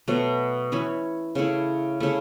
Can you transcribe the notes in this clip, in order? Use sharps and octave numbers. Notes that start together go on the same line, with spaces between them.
B2 F#3 A3
E3 C#4 E4 C#5
C#3 A3 E4
C#3 A3 E4